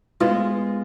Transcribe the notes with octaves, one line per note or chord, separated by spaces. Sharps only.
G#3 B3 F4